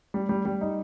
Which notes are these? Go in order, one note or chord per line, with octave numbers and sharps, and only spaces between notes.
G3
G3
G3
D#4